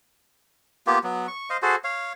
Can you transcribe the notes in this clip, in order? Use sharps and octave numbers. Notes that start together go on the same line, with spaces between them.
A#3 B3 F4 G4
F#3 B3
C#6
C5 D#5 F5
F#4 G#4 A4 C5
C#5 F5